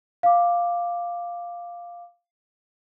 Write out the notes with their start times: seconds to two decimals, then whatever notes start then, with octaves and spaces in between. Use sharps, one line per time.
0.23 F5 D6